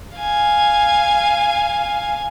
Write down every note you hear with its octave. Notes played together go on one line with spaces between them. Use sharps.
F5 G#5